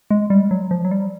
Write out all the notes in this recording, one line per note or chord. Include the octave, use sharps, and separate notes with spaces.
G#3
G3
F#3
F3
F#3
G3